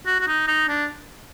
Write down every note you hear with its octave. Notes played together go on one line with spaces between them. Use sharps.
F#4
F#4
D#4
D#4
D4